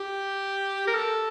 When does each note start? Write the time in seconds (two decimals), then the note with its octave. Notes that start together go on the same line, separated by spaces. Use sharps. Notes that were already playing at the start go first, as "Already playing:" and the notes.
Already playing: G4
0.87 A#4
0.94 A4